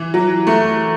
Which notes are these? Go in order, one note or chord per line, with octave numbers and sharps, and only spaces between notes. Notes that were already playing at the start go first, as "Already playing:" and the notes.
Already playing: E3
F#3
A3